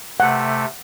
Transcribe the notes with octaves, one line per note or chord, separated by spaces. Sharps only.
C3 A3 F#5